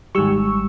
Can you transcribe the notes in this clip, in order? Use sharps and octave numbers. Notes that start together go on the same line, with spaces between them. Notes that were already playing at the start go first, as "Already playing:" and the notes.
G#1 G#2 G3 C#6 E6